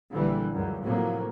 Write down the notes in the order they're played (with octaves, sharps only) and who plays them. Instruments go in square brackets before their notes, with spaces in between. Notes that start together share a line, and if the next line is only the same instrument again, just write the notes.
[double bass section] A#1 D3 E3 G3
C#2 F#2
A2 C3 F3 F#3 A#3